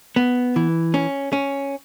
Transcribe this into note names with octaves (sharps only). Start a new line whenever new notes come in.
B3
E3
C#4
C#4